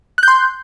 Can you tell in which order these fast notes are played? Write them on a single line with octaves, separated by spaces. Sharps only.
F#6 G6 C6